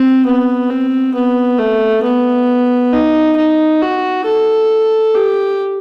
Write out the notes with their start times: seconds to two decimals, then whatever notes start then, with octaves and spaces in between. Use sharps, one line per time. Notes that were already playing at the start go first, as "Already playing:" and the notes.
Already playing: C4
0.26 B3
0.70 C4
1.15 B3
1.59 A3
2.03 B3
2.93 D#4
3.37 D#4
3.82 F#4
4.25 A4
5.15 G4